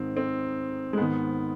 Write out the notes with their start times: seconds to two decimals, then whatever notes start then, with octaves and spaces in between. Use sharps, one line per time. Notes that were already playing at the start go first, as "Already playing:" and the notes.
Already playing: G#2 D#3 C4
0.17 C4
0.93 G#3
0.98 G#2 D#3 B3